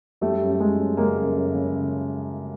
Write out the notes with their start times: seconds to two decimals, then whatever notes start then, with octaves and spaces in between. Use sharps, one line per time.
0.21 F#2 G3 A3
0.41 F#2
0.60 F#2 G#3
0.79 F#2
0.97 C#3 G#3 A#3
1.17 F#2
1.35 F#2
1.54 C#3